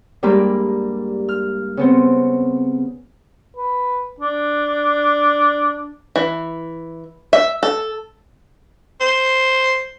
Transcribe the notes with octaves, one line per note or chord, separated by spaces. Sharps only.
G2 G3 G#3 A#3 G4 B5
F6
C#3 B3 C4
B4
D4
E3
E5
A4
C5